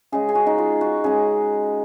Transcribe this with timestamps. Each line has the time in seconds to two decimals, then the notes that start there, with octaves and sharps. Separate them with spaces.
0.12 C#3 G#3 G#4
0.29 G#4
0.35 F#4
0.47 D#4
0.58 F4
0.81 F#4
1.04 C#3 G#3 G#4